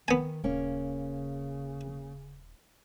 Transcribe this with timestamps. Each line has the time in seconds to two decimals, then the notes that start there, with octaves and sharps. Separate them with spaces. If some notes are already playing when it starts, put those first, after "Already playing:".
0.08 D#3 B3 G#5
0.44 D#1 C#3 A#3 C#4